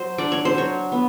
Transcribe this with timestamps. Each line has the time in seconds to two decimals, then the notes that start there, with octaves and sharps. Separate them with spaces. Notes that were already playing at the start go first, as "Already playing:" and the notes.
Already playing: F#3 C5
0.18 D4 D5
0.32 C#5
0.45 C5
0.55 F#3 C#5
0.92 B3